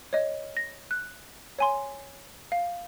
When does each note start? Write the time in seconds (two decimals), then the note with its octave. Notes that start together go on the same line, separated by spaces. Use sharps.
0.13 C#5 D#5
0.57 A#6
0.91 F#6
1.59 C#5 G#5 C6
2.52 F5